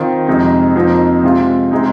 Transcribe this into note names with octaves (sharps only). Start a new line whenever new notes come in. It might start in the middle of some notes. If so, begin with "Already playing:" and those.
Already playing: D#3 C4 F4
F2 C3 G#3 D#4
F2 F3 A#3 D#4
C3 G#3 F4
C3 G#3 D#4